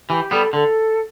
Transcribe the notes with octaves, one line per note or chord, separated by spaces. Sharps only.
E3 G4
G3 B3 A4
D3 A4